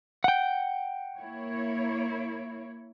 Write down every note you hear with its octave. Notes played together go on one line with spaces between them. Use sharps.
F#5 G5
A#3 E4 C#5